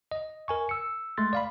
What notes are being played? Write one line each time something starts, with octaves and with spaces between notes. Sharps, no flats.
D#5
A#4 G#5 C#6
E6 C#7
G#3 A3 C6 A6
D5 F5 B5